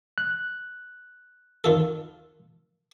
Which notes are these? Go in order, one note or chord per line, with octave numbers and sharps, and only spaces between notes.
F#6
D#3 F4 A4